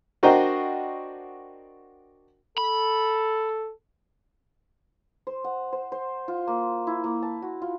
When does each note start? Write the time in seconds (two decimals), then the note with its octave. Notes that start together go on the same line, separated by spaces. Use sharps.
0.23 D4 F#4 A#4 C5 D#5 G5
2.58 A4 B5
5.27 C5
5.44 F#5
5.73 C5
5.92 C5
6.28 F4
6.47 A#3
6.87 E4
7.04 A#3
7.23 A5
7.42 F#4
7.62 F4